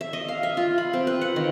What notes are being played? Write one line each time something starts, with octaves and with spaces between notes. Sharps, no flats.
E5
D#5
F5
E5
F4
B5
C4
B4
F#5
D#3